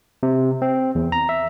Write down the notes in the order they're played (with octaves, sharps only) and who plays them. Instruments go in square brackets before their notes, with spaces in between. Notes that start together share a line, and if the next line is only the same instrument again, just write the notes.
[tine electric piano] C3
C4
E2
A#5
E5